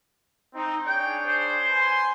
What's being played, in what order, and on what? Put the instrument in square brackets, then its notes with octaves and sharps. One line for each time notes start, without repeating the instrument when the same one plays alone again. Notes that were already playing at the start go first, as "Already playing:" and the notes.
[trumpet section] C4 D#4
[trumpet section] D4 G#4 C#5 [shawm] G5
[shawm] C5
[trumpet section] B4 G#5 C6